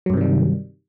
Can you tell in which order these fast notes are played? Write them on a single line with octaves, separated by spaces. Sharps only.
F#3 G2 C3 D#3 G3